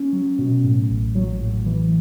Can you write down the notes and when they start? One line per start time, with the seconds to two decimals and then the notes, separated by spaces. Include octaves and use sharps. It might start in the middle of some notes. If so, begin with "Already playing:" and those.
Already playing: C#4
0.13 F#3
0.39 B2
0.64 A2
0.90 A1
1.15 F#3
1.41 A2
1.66 E3